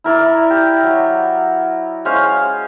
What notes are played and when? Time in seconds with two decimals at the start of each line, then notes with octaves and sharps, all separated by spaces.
0.04 E4 A#4 D5 E5
0.50 G4
0.83 F#3
2.05 G#3 C#4 C5 F5